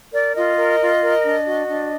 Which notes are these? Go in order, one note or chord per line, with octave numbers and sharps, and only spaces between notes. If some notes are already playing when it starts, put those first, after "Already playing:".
A#4 D5
F4 D#5
A#4
F4
A#4
D4
F#4
D4